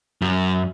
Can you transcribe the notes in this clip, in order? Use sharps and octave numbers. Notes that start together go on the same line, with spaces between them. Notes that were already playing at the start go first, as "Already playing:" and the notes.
F#2